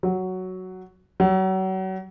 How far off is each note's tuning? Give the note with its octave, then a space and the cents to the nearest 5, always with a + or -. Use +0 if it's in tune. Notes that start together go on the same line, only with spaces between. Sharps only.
F#3 +5
F#3 +35